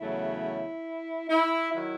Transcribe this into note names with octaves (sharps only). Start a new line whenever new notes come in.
E2 C#3 F#3 A3 E4
E4
D#3 F#3 E4